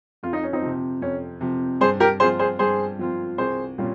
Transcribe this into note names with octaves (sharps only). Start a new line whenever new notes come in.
F2 F4
D#4
C#4
C4 D#4
C3 F3
F2 C#4
C3 F3
G2 G#4 C5
G4 A#4
F3 C4 F4 G#4 C5
G#4 C5
G2 G#4 C5
F3 C4 F4
C2 G#4 C5
A#2 G3 C#4 F4